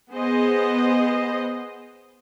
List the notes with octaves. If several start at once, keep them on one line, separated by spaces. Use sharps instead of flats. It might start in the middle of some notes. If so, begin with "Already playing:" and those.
B3 G#4 C5 D#5